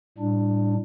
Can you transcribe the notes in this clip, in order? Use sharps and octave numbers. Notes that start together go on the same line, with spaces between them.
A2 G3 D4